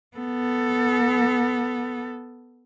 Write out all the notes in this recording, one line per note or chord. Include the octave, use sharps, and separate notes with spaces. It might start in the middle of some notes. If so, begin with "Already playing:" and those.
B3 A4